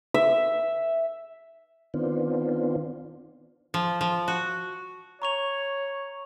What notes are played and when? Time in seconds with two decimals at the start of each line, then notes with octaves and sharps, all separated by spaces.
0.14 E5
1.94 D#3 B3 C4 D4 F4
3.74 F3
4.01 F3
4.28 F#4
5.22 C#5 A#5 C#6 F7